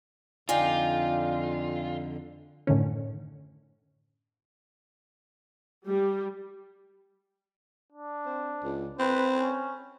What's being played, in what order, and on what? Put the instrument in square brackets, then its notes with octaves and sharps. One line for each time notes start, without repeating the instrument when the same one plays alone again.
[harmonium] F2 D3 [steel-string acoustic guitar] D4 D#4 G5 [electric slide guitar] F4 [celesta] G#5
[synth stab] F#2 A2 D3 D#3 C#4
[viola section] G3
[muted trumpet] D4
[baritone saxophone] C4
C#2
[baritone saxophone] C4 [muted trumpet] B4
[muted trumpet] C#4